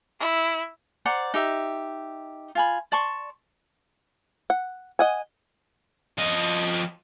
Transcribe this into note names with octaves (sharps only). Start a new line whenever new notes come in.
E4
C5 D5 F#5 A#5
D#4 G4 E5
F4 G#5 B5
D5 A5 C6 C#6
F#5
D#5 F#5 G#5
F3 D#5